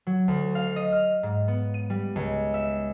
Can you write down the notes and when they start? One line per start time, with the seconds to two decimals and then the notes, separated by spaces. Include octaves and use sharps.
0.07 F#3
0.28 D2
0.55 F5
0.76 D#5
0.92 F6
1.23 G#2
1.48 B3
1.74 D#7
1.90 G3
2.16 C#2
2.54 E5